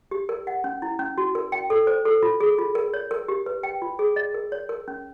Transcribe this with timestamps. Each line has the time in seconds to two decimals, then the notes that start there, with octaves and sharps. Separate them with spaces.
0.11 G4
0.29 A#4
0.47 F#5
0.64 C#4
0.82 E4
0.99 C#4
1.18 F#4
1.35 A#4
1.52 G5
1.70 A4
1.87 C5
2.05 A4
2.23 F4
2.40 G#4
2.59 F4
2.75 A#4
2.94 C#5
3.11 A#4
3.28 G4
3.46 B4
3.63 G5
3.82 F4
3.99 G#4
4.16 D#5
4.34 A#4
4.52 C#5
4.69 A#4
4.88 C#4